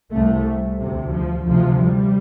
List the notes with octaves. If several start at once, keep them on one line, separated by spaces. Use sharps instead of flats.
C2 C3 A3
D2 C3
F3
D2 C3 F3
G3